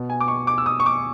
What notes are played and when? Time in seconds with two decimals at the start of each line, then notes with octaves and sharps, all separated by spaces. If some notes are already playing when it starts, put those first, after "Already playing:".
Already playing: B2
0.10 G#5
0.20 D6
0.28 C#6
0.47 D6
0.58 E6
0.66 D#6
0.80 C#6
0.86 D6